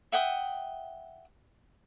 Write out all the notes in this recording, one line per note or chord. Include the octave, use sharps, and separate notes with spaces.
E5 F#5 G5 D#6